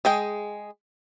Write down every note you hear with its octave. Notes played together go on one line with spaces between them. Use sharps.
G#3 G#4 G5